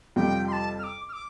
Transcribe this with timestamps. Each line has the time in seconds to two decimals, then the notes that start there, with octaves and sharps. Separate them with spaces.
0.16 F2 C3 G3 F4 G5
0.48 C6
0.52 A5
0.79 F6
0.83 D6
1.09 F6
1.13 D6